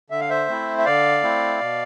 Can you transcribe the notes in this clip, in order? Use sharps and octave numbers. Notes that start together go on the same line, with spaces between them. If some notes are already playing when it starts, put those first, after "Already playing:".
D3 E5
F5
C5 E5
A3 C4 E4
E5
D3 D5 F5
A3 C4 E4
B2